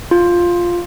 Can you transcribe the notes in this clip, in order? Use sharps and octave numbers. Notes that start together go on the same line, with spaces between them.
F4